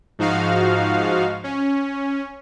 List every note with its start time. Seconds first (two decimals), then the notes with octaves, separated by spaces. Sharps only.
0.19 G#2 F3 D#4 F#4 F5
1.44 C#4